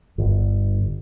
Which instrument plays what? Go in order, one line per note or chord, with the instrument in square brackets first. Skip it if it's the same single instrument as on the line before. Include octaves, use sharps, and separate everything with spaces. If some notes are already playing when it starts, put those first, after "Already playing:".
[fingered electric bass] G1